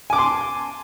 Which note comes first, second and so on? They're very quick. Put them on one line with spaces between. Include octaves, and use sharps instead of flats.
G#5 D6 A5 C6